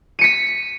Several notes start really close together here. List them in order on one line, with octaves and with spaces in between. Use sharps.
D#7 C#7 B6